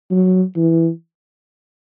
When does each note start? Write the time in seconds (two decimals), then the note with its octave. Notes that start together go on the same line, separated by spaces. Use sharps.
0.11 F#3
0.56 E3